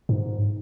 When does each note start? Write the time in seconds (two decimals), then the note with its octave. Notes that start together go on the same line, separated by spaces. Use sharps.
0.09 G#2